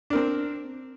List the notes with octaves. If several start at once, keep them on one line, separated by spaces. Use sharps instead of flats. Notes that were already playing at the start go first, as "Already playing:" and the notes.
C4 D4 A#4